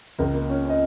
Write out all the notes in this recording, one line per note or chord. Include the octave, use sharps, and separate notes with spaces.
C#2 A#4
A#3
C#4
C#4
D#5